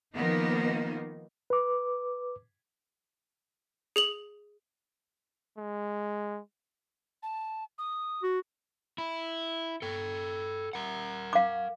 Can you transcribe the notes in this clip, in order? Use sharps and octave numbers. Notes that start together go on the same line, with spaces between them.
D#3 F3 A#3 B3 D#4
B4 D6
G#4 F7 F#7
G#3
A5
D#6
F#4
E4
A4 G5
A#4 F#5
F5 D6